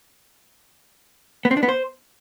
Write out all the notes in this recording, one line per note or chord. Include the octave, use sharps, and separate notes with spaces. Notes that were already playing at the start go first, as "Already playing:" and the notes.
B3
C4
D4
B3
C5